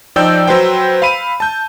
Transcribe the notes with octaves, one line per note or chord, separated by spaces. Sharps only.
F3 D#4 D5 G5 E6 G6
F#3 B4 C5 G5
F5 B5 D#7
A5 G6